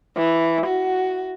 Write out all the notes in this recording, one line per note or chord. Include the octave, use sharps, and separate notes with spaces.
E3
F#4